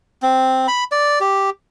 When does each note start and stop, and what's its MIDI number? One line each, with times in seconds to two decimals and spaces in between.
0.23 0.67 60
0.68 0.84 83
0.92 1.19 74
1.20 1.50 67